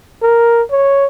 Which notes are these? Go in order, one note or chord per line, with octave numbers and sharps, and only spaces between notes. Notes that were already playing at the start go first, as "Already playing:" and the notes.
A#4
C#5